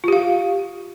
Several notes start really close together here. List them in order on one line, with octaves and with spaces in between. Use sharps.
F4 G4 F5